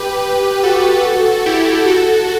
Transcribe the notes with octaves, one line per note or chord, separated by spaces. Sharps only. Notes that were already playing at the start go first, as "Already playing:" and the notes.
Already playing: G4 B4
F#4 A4
E4 G4
F#4 A4